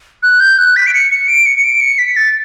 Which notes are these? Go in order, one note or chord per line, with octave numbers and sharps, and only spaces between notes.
F#6
G6
F#6
B6
D7
C#7
C#7
D7
C#7
C#7
D7
C#7
B6
A6